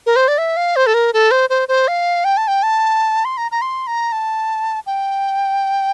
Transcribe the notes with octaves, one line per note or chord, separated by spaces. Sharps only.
A#4
C5
D5
E5
F5
C5
A4
A#4
A4
C5
C5
C5
F5
G5
A5
G5
A5
C6
A#5
A#5
C6
A#5
A5
G5